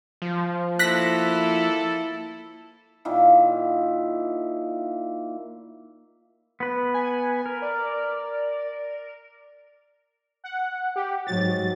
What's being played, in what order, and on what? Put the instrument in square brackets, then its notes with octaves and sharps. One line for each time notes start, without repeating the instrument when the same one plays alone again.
[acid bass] F3
[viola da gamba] A#3 E4 [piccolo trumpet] A4 [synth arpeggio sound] F#6 A#6 B6
[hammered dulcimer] A#2 D#3 A#3 E4
[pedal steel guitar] B3 B4
[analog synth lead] G#5
[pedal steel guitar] A#4
[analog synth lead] D5
[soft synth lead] F#5
G4
[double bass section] G#2 F#3 [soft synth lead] A6